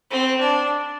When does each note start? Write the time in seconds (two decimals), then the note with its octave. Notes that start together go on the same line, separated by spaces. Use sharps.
0.10 C4
0.40 D4